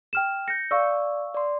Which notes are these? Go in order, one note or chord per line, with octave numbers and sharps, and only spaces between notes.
G5 F6 E7
G6 A#6 C#7
D5 F5 C#6 E6
D5 C6